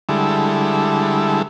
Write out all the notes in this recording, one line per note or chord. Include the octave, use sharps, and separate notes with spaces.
D3 G3 G#3 E4 A4